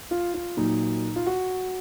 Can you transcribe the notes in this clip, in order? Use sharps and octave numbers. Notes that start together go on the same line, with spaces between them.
F4
F4
A#2 F#3 D#4
F4
F#4